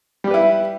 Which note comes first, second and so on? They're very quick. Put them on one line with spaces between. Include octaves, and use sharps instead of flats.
G3 G4 B4 E4